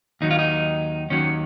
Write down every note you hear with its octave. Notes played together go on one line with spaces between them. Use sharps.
D#2 D#3 F#3 D#4
F4
D#4
D#2 D#3 F#3 C#4